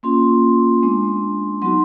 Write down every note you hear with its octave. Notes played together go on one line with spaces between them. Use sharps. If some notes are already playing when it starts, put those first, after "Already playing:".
A#3 C#4 F4 C6
G#3 B3 D4
F#3 B3 D#4 F#4 C6